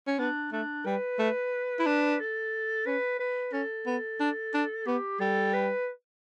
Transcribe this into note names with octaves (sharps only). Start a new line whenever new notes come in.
C#4
B3 D4
A3 D4
G3 B4
A3
E4
D4
A4
C#4 B4
B4
C#4 A4
B3
D4
D4
B3 G4
G3 A4
B4